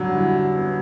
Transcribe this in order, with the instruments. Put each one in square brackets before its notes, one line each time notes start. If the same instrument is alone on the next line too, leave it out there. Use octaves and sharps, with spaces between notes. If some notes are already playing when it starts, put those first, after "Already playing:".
Already playing: [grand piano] D3 G3 [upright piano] F#3
[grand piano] E4
B3